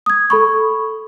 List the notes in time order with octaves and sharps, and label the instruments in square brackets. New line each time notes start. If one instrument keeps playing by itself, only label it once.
[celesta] D#6 G#6
A4 B5 C#6